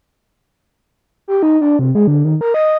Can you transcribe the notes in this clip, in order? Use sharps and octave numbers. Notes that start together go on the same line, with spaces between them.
G4
D#4
D4
C3
G#3
D3
D#3
A#4
D#5